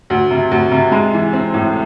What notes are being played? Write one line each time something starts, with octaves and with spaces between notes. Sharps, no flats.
D2
C3
D2
C3
G#3
E3
C4
A2